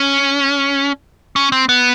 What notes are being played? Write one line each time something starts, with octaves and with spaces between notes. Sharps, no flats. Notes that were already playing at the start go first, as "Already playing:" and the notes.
Already playing: C#4
C#4
C4
B3